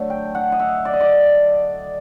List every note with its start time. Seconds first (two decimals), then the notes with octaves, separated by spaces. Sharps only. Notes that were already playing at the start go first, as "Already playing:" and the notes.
Already playing: D3 F#3 A3
0.10 G5
0.35 F#5
0.52 D#5
0.60 E5
0.85 D5
0.93 D#5
1.00 D5